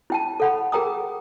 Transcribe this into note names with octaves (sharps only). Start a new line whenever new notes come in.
E4 G5 A5
A4 F#5 B5
G#4 A#4 G5 A#5 D#6